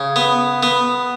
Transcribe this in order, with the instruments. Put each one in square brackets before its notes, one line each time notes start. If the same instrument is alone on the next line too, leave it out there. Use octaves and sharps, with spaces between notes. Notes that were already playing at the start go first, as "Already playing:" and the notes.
Already playing: [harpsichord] C#3
B3
B3